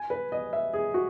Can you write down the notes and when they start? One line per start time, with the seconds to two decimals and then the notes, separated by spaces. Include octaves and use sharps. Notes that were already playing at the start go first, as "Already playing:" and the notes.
Already playing: G#5
0.10 B4
0.32 D#5
0.53 E5
0.73 G#4
0.94 F#4